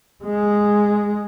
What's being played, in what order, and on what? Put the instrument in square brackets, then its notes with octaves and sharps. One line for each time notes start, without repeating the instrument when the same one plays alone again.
[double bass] G#3